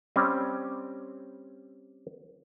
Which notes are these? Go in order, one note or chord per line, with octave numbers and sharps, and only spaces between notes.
G3 C4 C#4